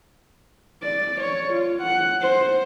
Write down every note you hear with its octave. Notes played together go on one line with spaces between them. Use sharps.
D5
C#5
F4
F#5
C5